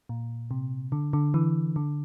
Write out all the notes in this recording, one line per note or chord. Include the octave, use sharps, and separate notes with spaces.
A#2
C3
D3
D3
E3
D3